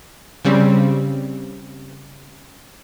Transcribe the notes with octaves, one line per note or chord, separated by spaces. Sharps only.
C#3 G3 C4